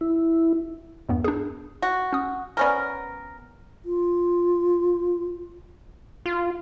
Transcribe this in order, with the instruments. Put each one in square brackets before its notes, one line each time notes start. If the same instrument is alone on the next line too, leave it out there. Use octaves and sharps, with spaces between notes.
[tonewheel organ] E4
[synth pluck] E2 G2 B3
D4 G#4
[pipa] F#4
[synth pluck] C#4 D#6
[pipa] B3 C#4 A#4 [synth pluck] C5 D5
[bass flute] F4
[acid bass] F4